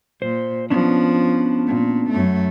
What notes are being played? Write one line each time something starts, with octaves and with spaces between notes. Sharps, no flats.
A#2 C5
F3 B3 C#4 D4
A#2
F#2 A3